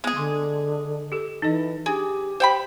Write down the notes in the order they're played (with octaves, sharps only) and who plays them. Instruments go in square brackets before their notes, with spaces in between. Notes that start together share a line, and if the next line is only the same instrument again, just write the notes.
[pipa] G#3 G#4 [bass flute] B3
[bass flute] D3 [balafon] C6 D6
[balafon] G4 A4
[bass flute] E3 [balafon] D#4 A4 D#5
[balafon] D4 G#5 [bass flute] G4 [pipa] G#4
[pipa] C5 G5 B5